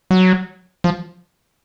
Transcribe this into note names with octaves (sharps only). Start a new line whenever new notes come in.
F#3
F3